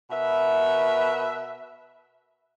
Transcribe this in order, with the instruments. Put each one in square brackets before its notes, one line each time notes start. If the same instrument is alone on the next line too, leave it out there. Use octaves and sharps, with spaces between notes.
[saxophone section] B2 A#4 B4 E5